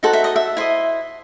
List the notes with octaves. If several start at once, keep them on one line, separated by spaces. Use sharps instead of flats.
D#4 F#4 A4 C5 F#5
E5
D#5
E5
E4 C5 D#5